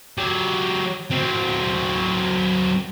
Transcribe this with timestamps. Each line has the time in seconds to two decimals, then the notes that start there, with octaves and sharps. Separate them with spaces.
0.18 F#3 G4
1.10 F#3 C4